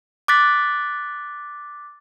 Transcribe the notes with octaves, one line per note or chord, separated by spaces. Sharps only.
D6 F#6 A6 B6